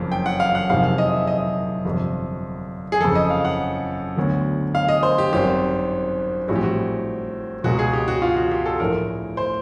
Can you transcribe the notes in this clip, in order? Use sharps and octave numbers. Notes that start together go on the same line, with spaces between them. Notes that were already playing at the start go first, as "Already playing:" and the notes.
Already playing: F#1 F2 C#3 F3 A#3
G5
F#5
F5
F#5
F#1 F2 C3 D#3 G#3 F5
F5
D#5
E5
D#5
G1 F2 C3
G#4
F#1 F2 C#3 A4
D#5
F5
F#5
D2 D3 F#3 B3
F5
D#5
C5
G4
G#1 F#2 D#3 G3 C4 G4
A#1 A2 E3 G3 C4 F#4
G4
F#4
C#2 B2 G#3 B3 F#4
G#4
G4
F#4
F4
F#4
G4
A4
A#1 A2 E3 A3 A#4
C5